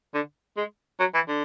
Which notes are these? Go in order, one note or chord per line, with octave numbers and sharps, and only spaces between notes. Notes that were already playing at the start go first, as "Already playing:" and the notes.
D3
G#3
F#3
E3
D3